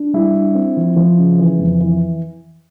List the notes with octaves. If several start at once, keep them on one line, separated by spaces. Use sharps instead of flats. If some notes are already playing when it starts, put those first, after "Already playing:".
Already playing: D4
G3 E4
D4
C4
F3
F3
C#3
E3
F2
E3